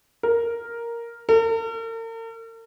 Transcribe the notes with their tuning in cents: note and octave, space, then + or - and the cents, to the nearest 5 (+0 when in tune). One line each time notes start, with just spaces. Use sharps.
A#4 +0
A#4 -45